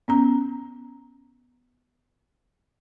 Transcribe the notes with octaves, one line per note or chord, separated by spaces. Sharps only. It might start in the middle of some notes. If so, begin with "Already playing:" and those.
B3 C#4 A#5